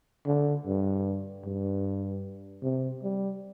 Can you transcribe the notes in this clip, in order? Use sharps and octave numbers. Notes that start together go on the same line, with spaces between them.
D3
G2
G2
C3
G3